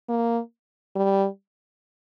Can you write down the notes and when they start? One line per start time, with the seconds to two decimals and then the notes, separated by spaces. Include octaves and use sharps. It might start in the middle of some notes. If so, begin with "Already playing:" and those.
0.09 A#3
0.96 G3